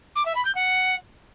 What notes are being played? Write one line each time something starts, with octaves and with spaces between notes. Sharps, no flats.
D6
E5
B5
G6
F#5